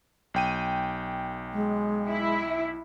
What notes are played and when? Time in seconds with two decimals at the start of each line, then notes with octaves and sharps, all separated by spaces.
0.34 B1 G5 D#7
1.53 G#3
2.07 E4